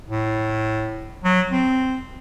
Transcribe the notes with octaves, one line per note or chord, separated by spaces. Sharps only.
A2
F#3
C4